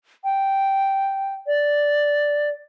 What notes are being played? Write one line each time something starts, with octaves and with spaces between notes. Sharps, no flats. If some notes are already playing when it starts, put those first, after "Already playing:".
G5
D5